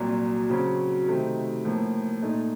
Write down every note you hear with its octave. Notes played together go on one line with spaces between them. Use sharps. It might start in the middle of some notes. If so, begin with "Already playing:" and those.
Already playing: C2 A#2 F#3
C#3 F#3 C4
C3 D#3 A3 C4 D#4
A2 F3 A#3
A#2 A3 D#4